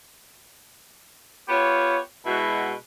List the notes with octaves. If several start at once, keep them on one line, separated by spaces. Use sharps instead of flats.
B3 F4 G4 C#5
B2 G#3 E4 F#4